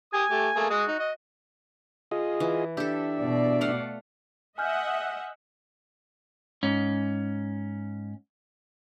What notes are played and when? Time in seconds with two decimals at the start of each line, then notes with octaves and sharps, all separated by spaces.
0.13 G4 G#5 D#6
0.30 A3 G4
0.56 A3 A#3 G#4
0.70 G#3 F#4 D#6
0.88 D#4
0.99 D#5
2.11 F4 G#4 D#5
2.40 E3
2.77 D4 G4 A4 E5
3.21 B2 D5
3.61 A3 F5 F#5
4.58 D#5 E5 F#5 G#5 F6 G6
6.63 G#2 C#4